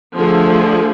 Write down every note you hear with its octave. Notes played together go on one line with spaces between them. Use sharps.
D3 F3 A3 G#4